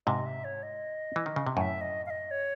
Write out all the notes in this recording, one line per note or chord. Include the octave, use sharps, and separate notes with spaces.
G#2 C3 D#5
E5
C#5
D#5
E3
D#3
C#3
C3
F#2 A2 E5 G#5
D#5
F5
D#5
C#5